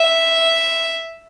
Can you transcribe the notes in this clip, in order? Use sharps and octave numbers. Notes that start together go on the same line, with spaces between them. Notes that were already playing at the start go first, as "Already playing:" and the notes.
Already playing: E5